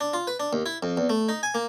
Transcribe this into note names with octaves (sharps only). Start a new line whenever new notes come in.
D4
F4
B4
D4
D#2
E4
F2
E2
A3
D#4
G#5
A#3